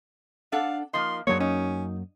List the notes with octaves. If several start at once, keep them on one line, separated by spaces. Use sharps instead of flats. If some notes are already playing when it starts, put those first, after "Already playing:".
D4 A4 F5 F#5
F3 A#3 D#4 C6
F#2 F#3 G#3 A#3 D4 C#5
C#4 D#4